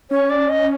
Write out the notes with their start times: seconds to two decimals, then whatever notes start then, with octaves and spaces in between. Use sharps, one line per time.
0.11 C#4 C#5
0.30 D5
0.49 D#5